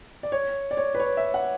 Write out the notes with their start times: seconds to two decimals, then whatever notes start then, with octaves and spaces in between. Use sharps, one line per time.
0.23 D5
0.32 C#5
0.71 D5
0.77 C#5
0.95 B4
1.00 C#5
1.17 E5
1.34 F#5